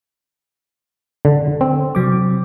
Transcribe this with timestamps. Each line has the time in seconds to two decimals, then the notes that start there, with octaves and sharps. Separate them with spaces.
1.25 D3
1.61 C4
1.95 C3 F#3 D6